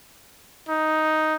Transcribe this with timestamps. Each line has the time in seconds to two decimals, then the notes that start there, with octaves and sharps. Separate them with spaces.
0.69 D#4